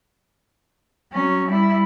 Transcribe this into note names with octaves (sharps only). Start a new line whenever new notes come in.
F#3 C#4
G3 E4